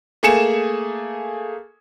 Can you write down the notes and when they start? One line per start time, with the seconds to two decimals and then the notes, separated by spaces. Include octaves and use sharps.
0.23 A3 A#3 G#4 G#5 C#7 E7